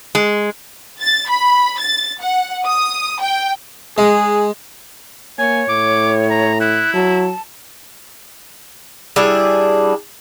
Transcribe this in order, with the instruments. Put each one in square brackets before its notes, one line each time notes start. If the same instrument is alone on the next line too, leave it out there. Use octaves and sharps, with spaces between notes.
[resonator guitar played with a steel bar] G#3
[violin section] A6
B5
A6
F#5
D#6
G5
[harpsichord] G#3 [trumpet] G#4
[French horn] A#3 [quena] C#5 [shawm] G#5
[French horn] A2 [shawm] D6
[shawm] A#5
[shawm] E4 [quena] F#6
[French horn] F#3 [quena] A5
[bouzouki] G3 D4 E4 G#4